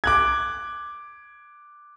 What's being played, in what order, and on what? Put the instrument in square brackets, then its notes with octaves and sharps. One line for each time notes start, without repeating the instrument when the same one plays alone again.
[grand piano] D6 F#6 G#6